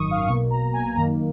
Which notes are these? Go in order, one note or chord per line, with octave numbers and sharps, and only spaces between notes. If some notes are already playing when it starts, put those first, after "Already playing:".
Already playing: G#1 F#2 D#3 C#6 D#6
F5
B1 B2 A#3 C#6
A#5
G#5
F#2 D#3 A#3 A#5